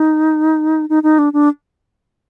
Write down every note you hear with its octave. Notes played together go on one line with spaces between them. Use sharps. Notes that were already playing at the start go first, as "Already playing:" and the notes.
Already playing: D#4
D#4
D#4
D4
D4